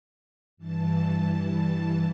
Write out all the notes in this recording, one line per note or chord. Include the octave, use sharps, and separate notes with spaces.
G2 E3 A5